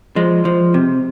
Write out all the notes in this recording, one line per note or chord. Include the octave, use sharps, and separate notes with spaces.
F3 G#3
F3
C3